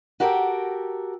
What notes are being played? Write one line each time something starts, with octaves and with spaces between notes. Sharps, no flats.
F#4 G4 A4 A#4 G5